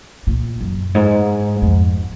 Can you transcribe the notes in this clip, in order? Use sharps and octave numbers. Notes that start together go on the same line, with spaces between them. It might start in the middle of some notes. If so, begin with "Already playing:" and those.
A#2
F#2
G#2
F2